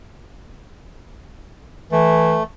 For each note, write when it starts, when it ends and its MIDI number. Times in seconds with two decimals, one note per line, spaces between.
1.92 2.39 52
1.92 2.43 57